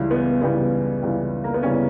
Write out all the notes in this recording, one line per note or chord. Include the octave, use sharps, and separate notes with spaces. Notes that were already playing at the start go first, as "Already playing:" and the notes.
Already playing: C#2 C#3 E3 G3
B3
C#2 C#3 E3 G3 B3
C#2 C#3 E3 G3
A#3
B3
C#3 E3 G3 C#4